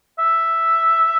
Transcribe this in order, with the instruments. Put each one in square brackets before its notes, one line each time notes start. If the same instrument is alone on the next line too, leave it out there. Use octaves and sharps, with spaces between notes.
[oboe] E5